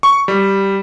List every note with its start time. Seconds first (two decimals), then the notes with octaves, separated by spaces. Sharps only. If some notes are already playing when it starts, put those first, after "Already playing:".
0.03 C#6
0.28 G3